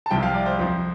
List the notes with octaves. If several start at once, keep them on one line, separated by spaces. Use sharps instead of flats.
A5
C2 C3 F3 G5
F5
D5
C5
F2 F3